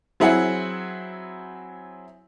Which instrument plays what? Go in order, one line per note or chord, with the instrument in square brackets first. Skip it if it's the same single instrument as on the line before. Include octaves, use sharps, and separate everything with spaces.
[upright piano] F#3 C4 E4 G#4 F#5